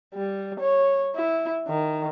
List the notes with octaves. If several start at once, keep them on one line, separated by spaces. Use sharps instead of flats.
G3
C#5
E4
D#3